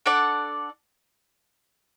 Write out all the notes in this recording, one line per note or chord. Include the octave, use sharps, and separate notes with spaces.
D4 A4 D5 F#5